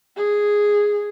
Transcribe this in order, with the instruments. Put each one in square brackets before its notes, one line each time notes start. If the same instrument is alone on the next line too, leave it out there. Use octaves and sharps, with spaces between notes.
[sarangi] G#4